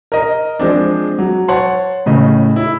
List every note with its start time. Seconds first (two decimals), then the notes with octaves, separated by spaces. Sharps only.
0.12 A#4 D#5
0.59 F3 G#3 C4 D4
1.19 F#3
1.48 C#5 F#5 A5 C6
2.06 A2 C#3 D#5
2.56 E4